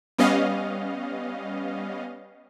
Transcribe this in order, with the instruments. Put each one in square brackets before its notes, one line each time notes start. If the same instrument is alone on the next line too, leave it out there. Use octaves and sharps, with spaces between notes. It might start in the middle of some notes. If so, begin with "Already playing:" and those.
[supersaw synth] G3 B3 C#4 D#5 F5